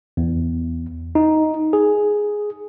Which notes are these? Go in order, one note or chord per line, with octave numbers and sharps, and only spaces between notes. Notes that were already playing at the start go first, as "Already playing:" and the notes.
E2
D#4
G#4